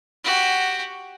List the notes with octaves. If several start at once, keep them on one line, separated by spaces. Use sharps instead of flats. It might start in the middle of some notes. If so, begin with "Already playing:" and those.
F#4 G4